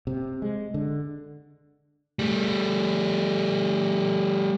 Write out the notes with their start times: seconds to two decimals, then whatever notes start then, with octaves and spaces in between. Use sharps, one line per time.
0.07 C3
0.42 G#3
0.74 D3
2.19 G3 A3